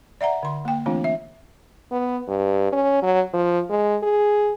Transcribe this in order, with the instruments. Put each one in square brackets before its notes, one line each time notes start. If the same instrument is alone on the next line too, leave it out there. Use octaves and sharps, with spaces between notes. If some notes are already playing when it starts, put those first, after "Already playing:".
[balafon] D5 E5 F#5 A#5
D3 C6
A#3 G5
E3 A3 C4 D4 F4
E5
[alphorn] B3
G2
C#4
F#3
F3
G#3
G#4